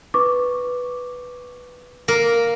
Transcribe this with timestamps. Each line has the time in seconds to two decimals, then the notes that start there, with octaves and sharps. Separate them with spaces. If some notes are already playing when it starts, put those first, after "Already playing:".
0.14 B4 C#6 D6
2.08 A#3 A#4